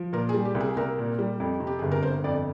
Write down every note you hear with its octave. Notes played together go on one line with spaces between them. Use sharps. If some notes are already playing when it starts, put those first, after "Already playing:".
Already playing: F3
A#2 A#4
G#4
G3
G4
C2
G#4
C2 A#4
A#2
G3
F2
C3
G4
G1 G#4
A#4
G1 C5
F2 D5